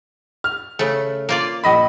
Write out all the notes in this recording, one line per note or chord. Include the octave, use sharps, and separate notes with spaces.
F6
C#3 A3
A#3 F4 D5
A#1 D#5 B5